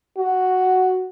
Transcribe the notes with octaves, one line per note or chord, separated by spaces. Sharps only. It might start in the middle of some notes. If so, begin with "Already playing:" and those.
F#4